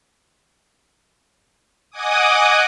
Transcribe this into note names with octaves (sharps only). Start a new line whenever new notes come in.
D#5 F#5 G#5 D6 D#6